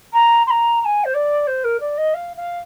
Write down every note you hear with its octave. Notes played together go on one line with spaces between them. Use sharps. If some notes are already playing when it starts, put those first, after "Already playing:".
A#5
C6
A#5
A#5
G#5
C5
D5
C5
A#4
D5
D#5
F5
F5